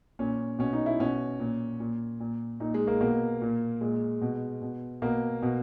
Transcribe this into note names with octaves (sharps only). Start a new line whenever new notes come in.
A#2 C#4
B2 C#4
D#4
E4
B2 C#4
A#2
A#2
A#2
A#2 D#4
G#3
A#3
B2 A#3
A#2
A#2 G#3
B2
B2
B2 A#3
B2